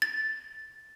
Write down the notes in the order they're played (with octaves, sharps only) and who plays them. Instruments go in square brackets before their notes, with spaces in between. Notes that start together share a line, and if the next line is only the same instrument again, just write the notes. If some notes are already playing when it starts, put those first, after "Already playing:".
[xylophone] A6